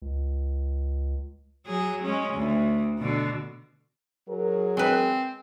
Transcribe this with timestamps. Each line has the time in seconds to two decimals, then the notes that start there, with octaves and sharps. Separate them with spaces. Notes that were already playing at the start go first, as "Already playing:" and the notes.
0.02 C#2
1.66 F#3 G#4
2.03 G#3 C#4
2.33 D2
2.99 B2 D3
4.28 F#3 G#4 A#4
4.77 G#3 C4 B4